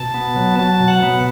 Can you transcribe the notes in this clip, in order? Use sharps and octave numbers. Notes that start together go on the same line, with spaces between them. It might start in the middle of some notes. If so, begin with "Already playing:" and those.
Already playing: B2 A5
B3
F#3
F#3 A5
B2
F#5
B3